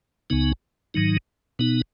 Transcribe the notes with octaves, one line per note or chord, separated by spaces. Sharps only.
C#2 C#3 B3 D#4
G#2 D#3 F#3 D#4
B2 B3 D#4